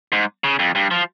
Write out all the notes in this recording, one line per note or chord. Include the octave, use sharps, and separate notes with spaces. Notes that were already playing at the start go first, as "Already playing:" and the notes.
G#2
C#3
F2
G2
F3